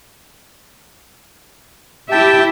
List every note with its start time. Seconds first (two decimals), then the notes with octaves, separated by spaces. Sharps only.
2.12 E4 G4 E5 G5 A5